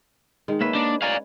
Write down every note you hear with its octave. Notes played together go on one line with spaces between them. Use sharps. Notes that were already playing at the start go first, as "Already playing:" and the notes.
D#3 G#3
A#3 C#4 B4 E5
A#3 D4 D#4
C#5 D5 F5 G#5 A#5